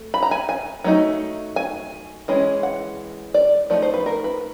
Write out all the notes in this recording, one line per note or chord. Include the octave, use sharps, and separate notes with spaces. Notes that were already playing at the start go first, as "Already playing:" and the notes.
Already playing: A3
B5
A#5
G#5
G#5
F#3 A3 C4 D#4
G#5
E3 G#3 C#4
F#5
D5
F3 A3 D#4 D5
C5
B4
A#4
B4